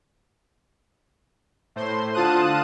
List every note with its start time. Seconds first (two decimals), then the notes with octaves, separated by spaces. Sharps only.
1.76 A2 C5 C6
2.14 D3 F4 A5 D#6 F#6 D#7